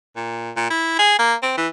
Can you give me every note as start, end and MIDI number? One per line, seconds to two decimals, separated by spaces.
0.16 0.51 46
0.56 0.67 46
0.70 0.98 64
0.99 1.17 68
1.19 1.34 58
1.42 1.54 60
1.57 1.68 52